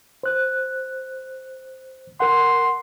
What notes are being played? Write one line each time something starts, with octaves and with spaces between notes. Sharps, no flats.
C5 F#6
A#4 F#5 C6